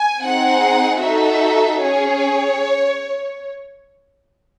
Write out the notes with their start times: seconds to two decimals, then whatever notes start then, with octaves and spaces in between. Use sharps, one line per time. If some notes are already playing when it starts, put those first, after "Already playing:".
Already playing: G#5
0.23 C4 D#4 G#4 F#5
1.01 D#4 F#4 A4 E5
1.80 C#4 G#4 C#5